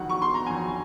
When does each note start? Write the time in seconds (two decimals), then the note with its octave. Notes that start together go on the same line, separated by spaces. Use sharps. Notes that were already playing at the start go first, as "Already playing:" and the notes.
Already playing: F2 D#3 F#3 F#5
0.10 C#6
0.22 C6
0.34 A#5
0.46 F2 D#3 F#3 G#5